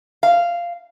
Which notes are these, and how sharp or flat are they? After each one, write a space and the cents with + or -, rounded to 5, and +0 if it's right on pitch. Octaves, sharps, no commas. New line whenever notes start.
F5 -10